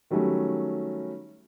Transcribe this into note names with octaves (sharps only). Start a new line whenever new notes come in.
D#3 F#3 G3 A3 C#4